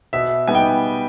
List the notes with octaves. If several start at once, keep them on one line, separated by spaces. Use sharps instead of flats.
B2 E5
G3 B3 D#4 G#5
G5